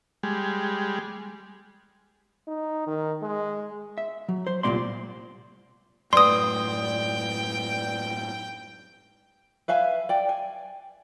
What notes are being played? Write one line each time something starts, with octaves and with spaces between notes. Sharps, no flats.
G3 G#3
D#4
D#3
G#3
E5
F#3
C5
C2 A#2 D#3 A#3 D5 C6
F#2 A2 B4 D5 G5 C6 D#6
B4 E5 F5 G#5
D5 G5
G#5